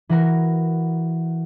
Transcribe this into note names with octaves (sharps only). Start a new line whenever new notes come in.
E3 F#4 A#4